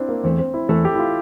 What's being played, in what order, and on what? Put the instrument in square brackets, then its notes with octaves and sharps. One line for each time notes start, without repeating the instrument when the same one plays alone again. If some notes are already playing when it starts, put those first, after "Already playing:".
Already playing: [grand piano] C4 D4 E4
A#3
[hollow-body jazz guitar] E2 E3 A3 [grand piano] C4
[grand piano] C4
E4
[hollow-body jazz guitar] E2 E3 A3 [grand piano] A4
[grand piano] G4
E4
F4